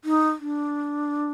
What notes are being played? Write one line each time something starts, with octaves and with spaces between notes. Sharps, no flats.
D#4
D4